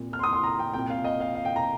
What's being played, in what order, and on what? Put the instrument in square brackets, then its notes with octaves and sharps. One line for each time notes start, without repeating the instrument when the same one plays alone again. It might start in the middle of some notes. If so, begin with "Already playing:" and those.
Already playing: [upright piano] C2 A#2
F6
C6
D#6
C6
A#5
G5
C2 A#2 G5
F5
D#5
F5
F5
G5
A#5